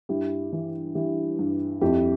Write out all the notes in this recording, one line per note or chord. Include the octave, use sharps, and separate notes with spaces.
G2 E4 G4
E3
E3 E4 G4
G2
F2 E4 G4